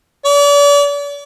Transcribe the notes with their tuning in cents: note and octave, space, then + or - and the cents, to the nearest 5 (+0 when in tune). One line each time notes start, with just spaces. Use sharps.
D5 -40